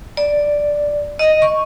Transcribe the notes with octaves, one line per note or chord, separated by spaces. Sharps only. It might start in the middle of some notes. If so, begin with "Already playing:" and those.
D5
D#5
C#6